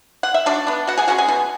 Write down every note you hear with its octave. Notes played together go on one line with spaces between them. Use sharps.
F#5
E5
F#3 D4 D5
B3 D4
B2 F#4 F#5
G#4 G#5
G#3 C#4 F#4 F#5
G#4 G#5
B2